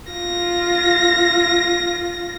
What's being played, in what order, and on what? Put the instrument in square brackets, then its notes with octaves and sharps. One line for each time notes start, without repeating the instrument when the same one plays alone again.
[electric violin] F4 A#6